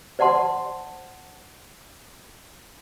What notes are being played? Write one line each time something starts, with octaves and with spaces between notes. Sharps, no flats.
C5 D5 F#5 A5 C6